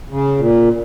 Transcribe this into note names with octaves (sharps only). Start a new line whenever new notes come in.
C#3
A#2